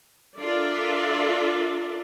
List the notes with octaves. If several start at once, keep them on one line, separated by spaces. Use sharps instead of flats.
D4 F4 A4 A#4 D5 E5